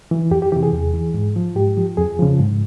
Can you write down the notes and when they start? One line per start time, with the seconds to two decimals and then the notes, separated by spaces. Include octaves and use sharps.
0.11 E3
0.31 F2 G4
0.42 G4
0.52 C3 E3 G4
0.63 G#4
0.73 E2
0.94 E3
1.14 G#2
1.36 F3
1.56 G#2 G4
1.77 F3
1.97 F2 G#4
2.19 C#3 F3
2.40 G#2